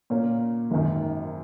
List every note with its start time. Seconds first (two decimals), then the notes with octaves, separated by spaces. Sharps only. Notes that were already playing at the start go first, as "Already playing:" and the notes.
0.10 A#2 A#3 C#4
0.71 G#1 F#2 D#3